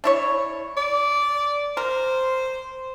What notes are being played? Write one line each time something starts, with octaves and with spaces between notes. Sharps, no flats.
D4 E4 C#5
D5
A#4 C5